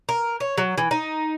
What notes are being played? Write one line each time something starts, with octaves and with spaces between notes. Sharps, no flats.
A#4
C#5
F#3
E3
D#4